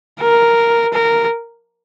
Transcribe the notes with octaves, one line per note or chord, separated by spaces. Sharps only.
A#4
A#4